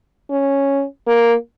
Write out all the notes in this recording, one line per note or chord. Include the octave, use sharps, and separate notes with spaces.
C#4
A#3